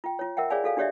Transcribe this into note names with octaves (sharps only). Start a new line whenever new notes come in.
F4 G5
F4 C#5
A#4 E5 F#5 G5
G#4 C#5 D5 F5 G#5 B5
F#4 A4 F5 G#5
D4 F#4 G4 C#5 D5 E5